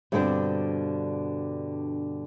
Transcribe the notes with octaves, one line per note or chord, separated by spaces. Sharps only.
G2 B2 D3 A3 C4 D4